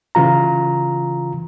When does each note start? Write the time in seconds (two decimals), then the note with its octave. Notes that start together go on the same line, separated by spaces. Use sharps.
0.15 C#3 E3 F4 A#5